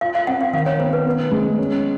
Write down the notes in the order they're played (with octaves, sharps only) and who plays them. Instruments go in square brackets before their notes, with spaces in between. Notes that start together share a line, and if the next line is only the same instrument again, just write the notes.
[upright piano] F4 [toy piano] F5
[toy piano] F5
[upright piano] C4 [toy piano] F#5
[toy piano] F5
[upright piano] D#3 [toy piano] F5
[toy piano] C#5
[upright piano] B3 [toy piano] C5
[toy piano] B4
[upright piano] B3
G#3
C#4